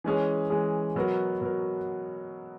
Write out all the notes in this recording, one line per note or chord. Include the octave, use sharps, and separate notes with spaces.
E3 G#3 C#4 G#4
E3 G#3 C#4 G#4
B2 F#3 B3 F#4 A#4
B2 F#3 B3 F#4 A#4